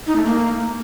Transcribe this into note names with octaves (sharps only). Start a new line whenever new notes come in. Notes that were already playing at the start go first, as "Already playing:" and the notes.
D#4
A3
A#3